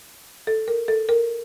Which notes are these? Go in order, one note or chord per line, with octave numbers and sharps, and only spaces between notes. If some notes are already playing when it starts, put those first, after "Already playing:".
A4
A#4
A4
A#4